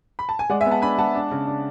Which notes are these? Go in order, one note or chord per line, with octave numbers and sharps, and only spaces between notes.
B5
A5
G#5
G#3 D5 F#5
E5 G#5
B3
F#5 A5
D4 G#5 B5
G#3 F#5 A5
D4
C#3
D4